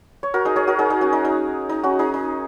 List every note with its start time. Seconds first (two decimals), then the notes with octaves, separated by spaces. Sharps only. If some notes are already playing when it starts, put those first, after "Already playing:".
0.23 C#5
0.34 F#4 A#4
0.45 D#4 G#4
0.56 G#4 C#5
0.67 F#4 A#4
0.79 D#4 G#4
0.90 D#4 G#4
1.01 C#4 F#4
1.13 D#4
1.25 D#4
1.69 D#4
1.83 C#4 F#4
1.99 D#4 G#4
2.14 D#4